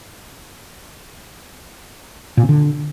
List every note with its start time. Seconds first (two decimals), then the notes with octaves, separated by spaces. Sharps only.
2.37 A#2
2.43 C3
2.49 D3